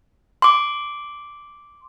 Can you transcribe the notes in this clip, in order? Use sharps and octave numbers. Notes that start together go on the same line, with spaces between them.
C6 D6